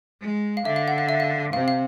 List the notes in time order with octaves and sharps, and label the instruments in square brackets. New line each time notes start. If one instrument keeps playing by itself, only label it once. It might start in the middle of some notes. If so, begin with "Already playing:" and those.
[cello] G#3
[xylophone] F5
[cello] D3 [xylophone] E5
[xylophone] F5
F#5
F5
E5
F5
[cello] C3 [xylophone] F5
[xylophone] F5